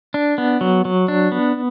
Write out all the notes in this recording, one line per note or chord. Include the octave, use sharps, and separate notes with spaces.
D4
B3
F#3
F#3
D4
B3